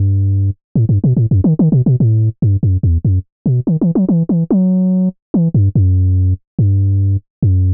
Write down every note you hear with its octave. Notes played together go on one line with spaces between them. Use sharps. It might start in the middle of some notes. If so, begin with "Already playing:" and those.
Already playing: G2
A2
G2
B2
A2
F#2
D#3
D#3
B2
B2
A2
G2
F#2
E2
F#2
B2
D#3
E3
F#3
E3
E3
F#3
E3
G2
F#2
G2
F#2